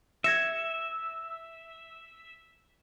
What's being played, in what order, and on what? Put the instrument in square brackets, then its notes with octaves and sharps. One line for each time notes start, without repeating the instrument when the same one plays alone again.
[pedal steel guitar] E5 [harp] G#6 A#6 C#7